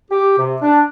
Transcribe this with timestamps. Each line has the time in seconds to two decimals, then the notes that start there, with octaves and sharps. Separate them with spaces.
0.11 G4
0.38 C3
0.61 D4